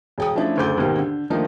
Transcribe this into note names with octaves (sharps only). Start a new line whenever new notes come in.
E1 G5 D#6
F3 A3 C#4 D4 E4
F#1 D2 A4 D6 G6
D#2 G#2 B2 D#3 A#3 D#4
D3
D#3 F3 A3 A#3 D4 D#4